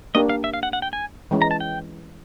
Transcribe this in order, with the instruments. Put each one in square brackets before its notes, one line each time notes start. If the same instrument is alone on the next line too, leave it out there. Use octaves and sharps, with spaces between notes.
[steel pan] A#3 D4 G4 [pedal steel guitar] D#5
[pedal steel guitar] F5
E5
F5
F#5
F#5
G5
G#5
[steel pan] E3 G#3 C#4
[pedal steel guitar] A#5
A5
G5